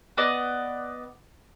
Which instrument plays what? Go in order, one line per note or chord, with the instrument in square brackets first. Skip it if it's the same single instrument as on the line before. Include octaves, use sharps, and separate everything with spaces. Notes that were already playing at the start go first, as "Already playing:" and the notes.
[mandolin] B3 D5 D#5